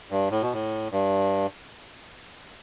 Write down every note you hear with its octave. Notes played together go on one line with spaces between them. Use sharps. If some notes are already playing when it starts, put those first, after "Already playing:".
G2
A2
B2
A2
G2